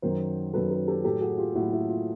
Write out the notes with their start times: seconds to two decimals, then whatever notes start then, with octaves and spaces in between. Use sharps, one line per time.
0.02 F#2 D#3 F#3 A#4 C5
0.53 F#2 D#3 F#3 A4 B4
0.71 A4 B4
0.87 G4 A4
1.04 A2 F#3 G4 A4
1.21 F#4 G#4
1.38 F4 G4
1.55 A2 F#3 E4 F#4
1.73 E4
1.89 F4